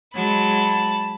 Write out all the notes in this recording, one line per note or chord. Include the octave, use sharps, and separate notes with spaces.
F#3 G#3 A5 B5